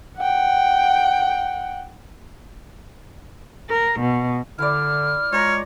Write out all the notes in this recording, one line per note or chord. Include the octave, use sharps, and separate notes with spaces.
F#5 G5
A#4
B2
D3 E4 D5 F6
G#3 F4 C#5 A#5